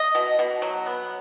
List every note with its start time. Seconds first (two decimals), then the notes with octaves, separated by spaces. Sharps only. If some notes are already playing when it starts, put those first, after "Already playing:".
Already playing: D#5
0.15 B2
0.39 B2
0.62 F#3
0.86 B3